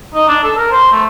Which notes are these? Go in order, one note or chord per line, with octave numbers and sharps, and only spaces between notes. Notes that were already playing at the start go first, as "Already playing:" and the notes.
D#4
D4
A4
A#4
C5
A3